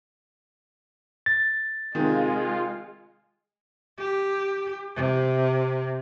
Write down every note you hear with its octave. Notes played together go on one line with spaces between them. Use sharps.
A6
C3 D#3 G#3 F4
G4
C3